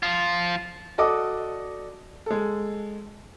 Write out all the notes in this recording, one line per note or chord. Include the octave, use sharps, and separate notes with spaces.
F3 F4
F#4 A4 D5 D#5 D6 D#6
G#3 A4